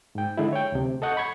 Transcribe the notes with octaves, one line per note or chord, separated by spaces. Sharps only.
G#2 G5
D3 G#3 E4
C#5 G5
D2 C3
A4 D#5 F#5 C#6 G6
B5 C#6 G#6